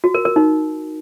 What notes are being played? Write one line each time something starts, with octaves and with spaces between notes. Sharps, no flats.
F#4
A#4
A#4
D#4